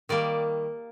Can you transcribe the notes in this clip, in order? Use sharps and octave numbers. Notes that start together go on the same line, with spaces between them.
D#3 G3 A#3 D5